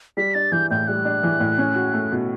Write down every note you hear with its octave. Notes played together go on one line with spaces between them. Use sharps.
G3 B6
D4 A6
E3 G6
A2 G6
G3 F#6
D4
E3
A2
C#4
F#4
A3
B2